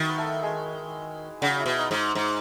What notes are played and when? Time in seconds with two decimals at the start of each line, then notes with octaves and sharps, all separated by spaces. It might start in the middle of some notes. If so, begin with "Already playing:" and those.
Already playing: D#3 F#3 E4 F#4
0.09 B4
0.18 A3 A4
0.42 G#3 G#4
1.41 C#3 F#3 F#4
1.60 E4
1.66 B2
1.79 D#4
1.91 G#2
2.15 G#2 D#4